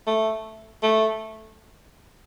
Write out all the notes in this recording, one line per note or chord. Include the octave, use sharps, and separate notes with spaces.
A3
A3